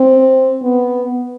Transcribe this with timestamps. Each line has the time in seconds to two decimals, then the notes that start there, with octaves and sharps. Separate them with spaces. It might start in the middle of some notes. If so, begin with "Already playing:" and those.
Already playing: C4
0.63 B3